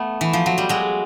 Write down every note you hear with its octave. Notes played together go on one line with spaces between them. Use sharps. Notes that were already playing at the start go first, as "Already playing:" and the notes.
Already playing: A3 B3
E3
F3
F#3
G3
F#3 G#3